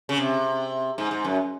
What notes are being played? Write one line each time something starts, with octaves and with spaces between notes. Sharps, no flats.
C#3
C3
G#2
G#2
F#2